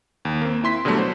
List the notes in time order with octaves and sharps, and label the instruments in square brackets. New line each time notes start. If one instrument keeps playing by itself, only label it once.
[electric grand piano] D#2
A#3 C4
E4 C6 B6
B2 D3 F#3 G3 A3
C5